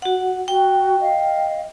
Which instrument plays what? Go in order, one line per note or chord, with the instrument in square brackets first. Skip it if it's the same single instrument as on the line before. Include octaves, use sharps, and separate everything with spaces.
[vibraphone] F#4 F#5
[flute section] F#4 [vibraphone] G5
[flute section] D#5 F5